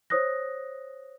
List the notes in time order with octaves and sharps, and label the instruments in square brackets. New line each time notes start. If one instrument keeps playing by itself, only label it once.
[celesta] C5 C#5 D#6 F#6 A#6